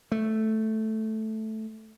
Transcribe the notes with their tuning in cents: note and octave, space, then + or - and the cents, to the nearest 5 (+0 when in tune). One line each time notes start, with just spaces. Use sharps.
A3 -5